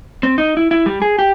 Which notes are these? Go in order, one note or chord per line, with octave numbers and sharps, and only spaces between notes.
C4
D#4
E4
E4
G3
G#4
G4